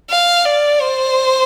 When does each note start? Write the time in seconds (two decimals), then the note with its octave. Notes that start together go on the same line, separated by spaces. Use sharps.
0.10 F5
0.45 D5
0.81 C5